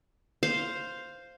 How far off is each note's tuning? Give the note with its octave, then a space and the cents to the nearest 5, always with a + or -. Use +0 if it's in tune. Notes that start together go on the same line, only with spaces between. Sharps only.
C5 +0 F5 +0